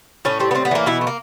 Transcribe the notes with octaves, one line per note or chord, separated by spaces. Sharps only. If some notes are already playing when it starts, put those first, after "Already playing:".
A2 C#4
G3 C4
B3
A2 C4
B3
E3 A#3
B2 E4
A3
A#3